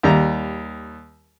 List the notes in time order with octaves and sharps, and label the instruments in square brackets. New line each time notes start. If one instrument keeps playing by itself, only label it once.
[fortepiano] D#2 G3 A#5